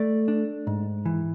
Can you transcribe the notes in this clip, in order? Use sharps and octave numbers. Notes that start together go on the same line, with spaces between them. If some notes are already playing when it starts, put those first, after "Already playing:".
Already playing: A3 D5
D4
G#2
E3